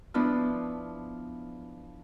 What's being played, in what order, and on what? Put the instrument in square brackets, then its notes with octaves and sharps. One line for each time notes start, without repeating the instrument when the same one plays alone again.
[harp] F3 B3 D4 E4 F4